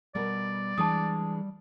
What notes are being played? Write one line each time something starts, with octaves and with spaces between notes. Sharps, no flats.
B2 G3 B3 A#4 D5
E3 G#3 D4 A5 D#6